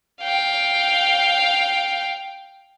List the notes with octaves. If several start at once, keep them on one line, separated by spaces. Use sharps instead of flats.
F5 G5